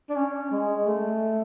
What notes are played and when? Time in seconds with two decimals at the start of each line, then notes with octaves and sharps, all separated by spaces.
0.09 D4
0.15 C#4
0.51 G#3
0.87 A3